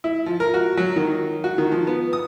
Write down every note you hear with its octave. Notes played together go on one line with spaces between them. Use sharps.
E4
F3
A#4
F#4
F#3
D#3
F#4
D#3
F3
B3
D#6